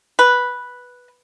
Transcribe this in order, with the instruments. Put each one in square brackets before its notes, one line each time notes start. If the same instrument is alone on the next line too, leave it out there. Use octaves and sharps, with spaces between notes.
[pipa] B4